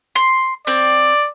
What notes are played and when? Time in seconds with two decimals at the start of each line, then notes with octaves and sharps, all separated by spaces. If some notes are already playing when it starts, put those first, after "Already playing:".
0.15 C6
0.67 C4 D5